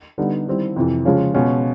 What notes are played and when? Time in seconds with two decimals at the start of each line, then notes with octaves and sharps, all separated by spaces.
0.18 D3 G3 B3 D#4
0.47 D#3 G3 C4 E4
0.76 F2 C3 E3
1.05 C#3 F3 G#3 C#4 F4
1.34 B2 G#3 C#4 F4